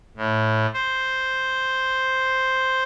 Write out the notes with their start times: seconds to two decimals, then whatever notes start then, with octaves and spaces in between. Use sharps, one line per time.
0.17 A2
0.73 C5